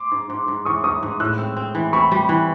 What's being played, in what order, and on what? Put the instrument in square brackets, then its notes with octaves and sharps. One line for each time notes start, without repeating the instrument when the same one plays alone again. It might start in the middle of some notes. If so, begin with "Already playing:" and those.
Already playing: [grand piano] C6 D6
[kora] G#2
G#2
G#2
[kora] E3 [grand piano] C#6 D#6
[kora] G#2 [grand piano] C#6 D#6
[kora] G#2
[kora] A2 [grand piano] E6 F#6
[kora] C4
C4
E3
[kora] C4 [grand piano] B5 C#6
[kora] G3
E3